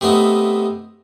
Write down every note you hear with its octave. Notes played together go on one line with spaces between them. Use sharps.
C3 A3 B3 D#4